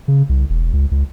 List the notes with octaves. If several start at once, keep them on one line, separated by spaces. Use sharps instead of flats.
C#3
C2
E1
C#2
C#2